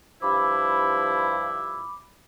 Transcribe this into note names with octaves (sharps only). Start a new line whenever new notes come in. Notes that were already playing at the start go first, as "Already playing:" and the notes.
G2 F3 E4 B5 D6